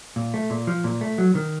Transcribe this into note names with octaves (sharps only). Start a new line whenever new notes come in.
A#2
A3
A#2
F3
A#2
A3
F#3
D#3